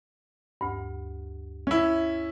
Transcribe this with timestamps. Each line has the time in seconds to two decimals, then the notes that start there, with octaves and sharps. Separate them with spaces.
0.61 D2 G2
1.67 C#4 E4